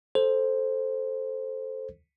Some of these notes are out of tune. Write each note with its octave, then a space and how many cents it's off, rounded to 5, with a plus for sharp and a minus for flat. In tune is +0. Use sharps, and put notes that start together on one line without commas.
A4 -5 C5 +5